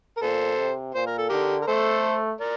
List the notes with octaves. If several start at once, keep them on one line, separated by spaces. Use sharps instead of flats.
A#4
A#2 A4 C5
C3
A#2 C5
A#4
A4
D3 G4 A#4
A#4
A3 A4 C5
A#4 D5